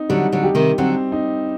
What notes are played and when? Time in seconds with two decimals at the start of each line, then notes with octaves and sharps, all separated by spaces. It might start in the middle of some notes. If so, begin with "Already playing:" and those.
Already playing: C4 D#4
0.09 D3 F#3 G3
0.32 D3 F#3
0.43 G4
0.55 C3 D#3
0.78 D3 F#3 C4
1.12 D#4